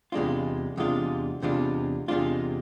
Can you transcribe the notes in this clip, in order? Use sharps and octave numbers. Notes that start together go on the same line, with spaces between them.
E2 C3 G#3 D4 F4
E2 C3 G#3 D4 F4
E2 C3 G#3 D4 F4
E2 C3 G#3 D4 F4